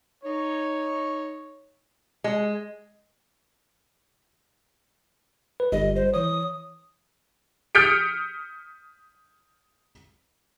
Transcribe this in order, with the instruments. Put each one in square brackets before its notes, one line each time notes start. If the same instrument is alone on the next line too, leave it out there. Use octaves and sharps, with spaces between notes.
[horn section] D#4 C#5
[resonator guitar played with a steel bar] G#3
[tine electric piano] B4
[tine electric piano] G1 G3 [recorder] D#5
[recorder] C5
[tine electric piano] E3 C#5 [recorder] D#6
[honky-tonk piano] D#6 F6 G6 B6 C#7 D7